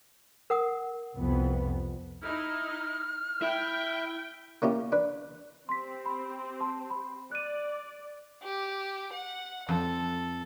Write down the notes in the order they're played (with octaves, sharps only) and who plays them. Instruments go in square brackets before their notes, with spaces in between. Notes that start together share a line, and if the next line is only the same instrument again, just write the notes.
[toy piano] A#4 F#5 D#6
[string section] C2 F2 B3
[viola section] D#4 E4 [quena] F6
[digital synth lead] E4 [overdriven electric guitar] E5 [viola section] G5
[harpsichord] A#3 C#4 E4 G4
D4 B4
[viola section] C4 G4 C5 [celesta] C6 B6
[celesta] B5
A5 C6
B5
[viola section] D5 [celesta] F#6 D#7
[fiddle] G4
F#5
[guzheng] F2 [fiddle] A4